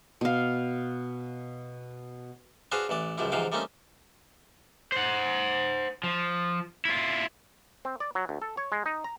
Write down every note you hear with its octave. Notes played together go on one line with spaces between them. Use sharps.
B2 F5
D4 F#4 G#4 B4 C5 F5
A1 E3 D5
C#2 F#2 F3 G3 E4
G#2 C3 E3 F3 F5 G5
G3 A3 A#3 C4 C#4 D#4
C5 F#5
F3
E4 F4
C4
D5
F#3
D2
A4
C#5
G#3
D#4
A#5